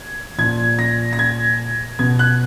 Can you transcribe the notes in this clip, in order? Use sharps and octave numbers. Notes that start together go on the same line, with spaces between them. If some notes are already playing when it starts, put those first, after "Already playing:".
Already playing: G#6
A#2 F3 G#6
A#6
A#6
G#6
B2 G#6
F#6